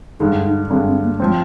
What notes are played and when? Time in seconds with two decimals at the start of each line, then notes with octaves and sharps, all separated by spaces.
0.20 G2 D3 G#3 D#4
0.46 D#4
0.70 G2 D3 G#3 C4
0.87 C4
1.04 A#3
1.19 F3 G#3 C4